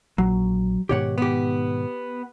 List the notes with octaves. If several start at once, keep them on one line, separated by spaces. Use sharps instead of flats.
A#1 F#3
G#2 B2 D#3 G4 C#5 F#5
B3 G4